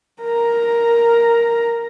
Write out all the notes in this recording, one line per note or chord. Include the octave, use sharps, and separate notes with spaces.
A#4 A#5